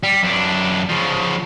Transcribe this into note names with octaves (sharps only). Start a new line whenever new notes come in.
G3
F#2 D4
C#3 F3